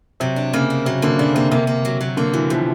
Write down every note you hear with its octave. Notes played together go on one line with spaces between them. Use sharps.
C3 F#3
D4
C#3 A#3
D4
C3 F#3
D3 A#3
C#3 D4
C3 A#3
C3 A#3
A#3
F#3
F#3
D3 A#3
E3 F#3
B2 F3